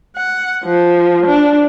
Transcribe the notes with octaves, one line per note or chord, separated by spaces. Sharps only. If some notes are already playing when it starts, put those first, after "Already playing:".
F#5
F3
D4